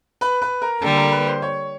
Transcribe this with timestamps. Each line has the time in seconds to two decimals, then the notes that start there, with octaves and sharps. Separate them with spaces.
0.21 B4 B5
0.42 B4 B5
0.62 A#4 A#5
0.82 D3 G3 A#3 A4 A5
0.97 A#4 A#5
1.12 B4 B5
1.27 C5 C6
1.42 C#5 C#6